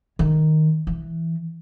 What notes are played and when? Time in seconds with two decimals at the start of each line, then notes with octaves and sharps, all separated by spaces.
0.19 D#3
0.87 E3